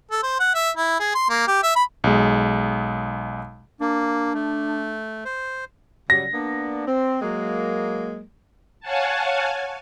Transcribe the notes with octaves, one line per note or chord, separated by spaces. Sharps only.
A4
C5
F#5
E5
E4
G#4
C6
A#3
G4
E5
B5
B1 G#3
A#3 D4
A3
C5
C#3 F#3 G3 A#6
A#3 B3 D4
C4
F#3 G#3 A#3
C#5 F5 F#5 G#5 A5